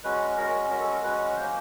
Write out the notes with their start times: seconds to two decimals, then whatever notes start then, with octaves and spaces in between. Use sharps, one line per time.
0.04 G#3 C#4 F#4 B4
0.37 G#3 C#4 F#4 A#4
0.70 G#3 C#4 F#4 A#4
0.81 A4
0.92 A#4
1.03 G#3 C#4 F#4 B4
1.36 F#3 A#3 C#4 C5